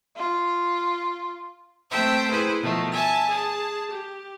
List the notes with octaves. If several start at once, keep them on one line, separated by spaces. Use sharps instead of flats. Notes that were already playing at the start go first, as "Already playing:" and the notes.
F4
A3 C4 C5 E5 G5 A5
E4 G#4 B4 C5
B2 D#3 F3 A3
E5 G#5 A5
G#4 A5
G4